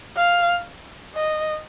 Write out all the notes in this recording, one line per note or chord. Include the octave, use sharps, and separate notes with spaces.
F5
D#5